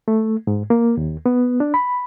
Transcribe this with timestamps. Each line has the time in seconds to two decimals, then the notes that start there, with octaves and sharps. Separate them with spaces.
0.08 A3
0.47 G#2
0.70 A#3
0.97 D#2
1.26 B3
1.60 D4
1.74 B5